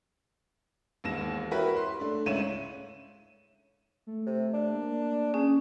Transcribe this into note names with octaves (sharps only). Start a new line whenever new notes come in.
E1 D#2 A#6 E7
E4 F#4 G4 A#4 B4 C#5
C6
A3 D4
C#2 G#2 E4 C#5 D#7 E7
A3
C3
D4
A#3
C#4 G#4